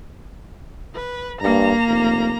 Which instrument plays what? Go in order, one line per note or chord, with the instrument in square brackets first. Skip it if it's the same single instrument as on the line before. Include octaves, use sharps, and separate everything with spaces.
[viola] B4
[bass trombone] G2 [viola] A#3 A#5
[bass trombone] F1